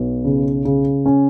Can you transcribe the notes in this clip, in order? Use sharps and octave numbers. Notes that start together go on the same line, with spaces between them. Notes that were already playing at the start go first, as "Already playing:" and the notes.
Already playing: B1 B3
C#3
C#3
C#4